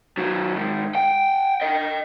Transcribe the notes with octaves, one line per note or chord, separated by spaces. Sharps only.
D#3 F#3
G#2 D#3
F#5 G5
D#5 G5